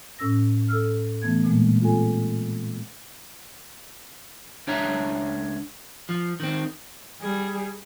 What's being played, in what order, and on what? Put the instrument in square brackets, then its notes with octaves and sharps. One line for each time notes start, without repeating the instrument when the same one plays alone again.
[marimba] A2 C#4 E6 A#6
A4 E6 F6
E3 A3 B3 G#6
A#2 E3 G#3 A#3
C4 F4 G#4 A4 G#5
[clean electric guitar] C#2 D4 C#5 E5 A#5
F3
D#3 C4
[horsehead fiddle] G3 G#4